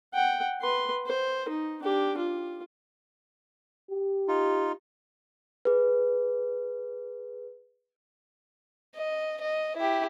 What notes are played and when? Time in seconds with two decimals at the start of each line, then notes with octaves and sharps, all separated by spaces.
0.14 F#5 G5
0.62 B4 C6
1.07 C5
1.49 D#4
1.82 D4 G4
2.18 F4
3.91 G4
4.28 D#4 F4
5.65 G#4 B4
8.96 D#5
9.41 D#5
9.77 E4 G4